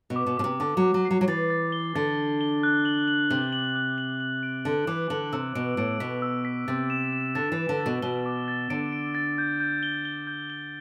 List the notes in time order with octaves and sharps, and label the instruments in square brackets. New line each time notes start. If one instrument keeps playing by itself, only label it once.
[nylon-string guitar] B2
[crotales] D6
[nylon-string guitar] B2
[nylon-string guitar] B2 [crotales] D6
[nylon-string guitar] C3
[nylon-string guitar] D3 [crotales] D6
[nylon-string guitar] F#3
[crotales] D6
[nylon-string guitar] F#3
[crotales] C7
[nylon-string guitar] F#3
F#3
[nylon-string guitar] E3 [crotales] A6
[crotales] A6
G7
[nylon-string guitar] D3 [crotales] A6
[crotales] A6
G7
F#6
F#7
F#7
[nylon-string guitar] C3 [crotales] F#7
[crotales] F#7
F#6
F#7
F#7
D7
[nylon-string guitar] D3 [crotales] D7
[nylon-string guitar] E3 [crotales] D6
[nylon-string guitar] D3 [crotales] F#7
[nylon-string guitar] C3 [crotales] E6
[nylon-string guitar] B2 [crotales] D7
[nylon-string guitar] A2 [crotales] D7
[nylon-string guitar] B2 [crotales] B6
[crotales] E6
B6
[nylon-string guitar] C3 [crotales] A6
[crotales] E7
E7
[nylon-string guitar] D3 [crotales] A6
[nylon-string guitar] E3
[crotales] E7
[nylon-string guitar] D3
[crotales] A6
[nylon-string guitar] B2
[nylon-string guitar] B2 [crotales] G7
[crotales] D6
A6
[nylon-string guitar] D3 [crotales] D7
[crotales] D7
A6
G6
G6
G7
G7
G6
G7